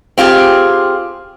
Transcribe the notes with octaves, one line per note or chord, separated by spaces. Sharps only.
C4 F4 G4 G#4